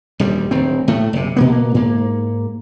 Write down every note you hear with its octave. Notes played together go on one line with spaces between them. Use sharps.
D#1 D2 G3
D1 D#3 C4
A2 A3
F#1 C3
A#2 A#3 B3
G#2 A#3